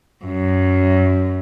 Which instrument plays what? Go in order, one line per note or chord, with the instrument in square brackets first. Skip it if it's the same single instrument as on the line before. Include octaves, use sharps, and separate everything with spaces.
[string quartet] F#2